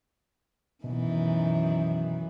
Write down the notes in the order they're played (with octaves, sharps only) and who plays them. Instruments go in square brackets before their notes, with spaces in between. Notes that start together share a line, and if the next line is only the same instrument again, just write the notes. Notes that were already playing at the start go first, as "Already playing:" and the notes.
[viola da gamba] F#2 D#3 E3 [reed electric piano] B2